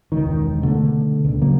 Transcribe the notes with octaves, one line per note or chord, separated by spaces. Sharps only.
E1 C#2 D#3
B2 D3 A3
C#2 A#2
C#3 F#3 A#3